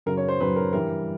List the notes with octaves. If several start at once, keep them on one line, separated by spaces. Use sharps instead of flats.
F#2 C#3 F#3 A#4
C#5
C5
F#2 C#3 F#3 B4
A#4
G2 E3 G3 A#4